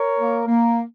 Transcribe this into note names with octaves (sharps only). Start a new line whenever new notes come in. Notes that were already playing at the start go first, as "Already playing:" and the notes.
Already playing: A#4 C#5
A#3
A#3